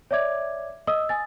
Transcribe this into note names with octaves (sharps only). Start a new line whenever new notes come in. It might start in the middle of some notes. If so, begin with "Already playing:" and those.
C#5 D5 E5 D6 G#6
D#5 D#6 E6
G#5 A6